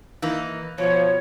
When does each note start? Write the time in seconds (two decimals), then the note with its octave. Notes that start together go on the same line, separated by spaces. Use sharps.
0.22 E3 A#3 D#4
0.78 B2 F3 C#5